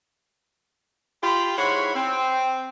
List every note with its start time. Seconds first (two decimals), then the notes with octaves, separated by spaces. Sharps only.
1.23 F4 G4 B5
1.57 G#2 E4 F#4 C#5 B5 C6
1.95 C4